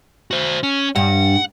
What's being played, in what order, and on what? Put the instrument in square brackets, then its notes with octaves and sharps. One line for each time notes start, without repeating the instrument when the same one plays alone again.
[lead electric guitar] F#4 C5
C#4
[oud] G2 G3 [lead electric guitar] F#5